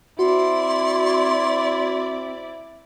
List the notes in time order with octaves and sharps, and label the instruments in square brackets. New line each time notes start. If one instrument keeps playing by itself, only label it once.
[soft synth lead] C4 [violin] E4 D5 [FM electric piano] F#4 [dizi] C6